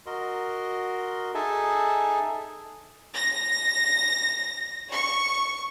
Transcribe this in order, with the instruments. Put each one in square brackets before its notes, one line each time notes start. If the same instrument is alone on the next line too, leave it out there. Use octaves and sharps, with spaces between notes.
[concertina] F#4 A#4 D#5 C6
D#4 G#4 A4 E5 G#5 A5
[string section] A#6
C#6